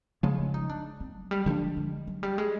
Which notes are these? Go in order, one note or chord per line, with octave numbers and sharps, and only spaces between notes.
C#3 F3 G#3 E4
E4
D#4
D4
C4
F#3
G3
D3 F3 G#3 A#3 D4
G#3
F#3
G3
G#3